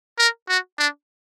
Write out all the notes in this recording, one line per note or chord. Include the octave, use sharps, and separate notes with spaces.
A#4
F#4
D4